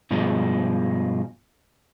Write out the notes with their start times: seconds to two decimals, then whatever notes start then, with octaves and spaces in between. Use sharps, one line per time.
0.11 G2 B2 F3 G#3